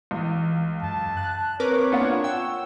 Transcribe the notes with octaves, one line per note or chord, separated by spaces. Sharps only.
C#2 E3
F#2 A5
F#6
C4 A#4 B4 C#5 D6
A#3 B3 D4 F4 F#5
F#5 G5 E6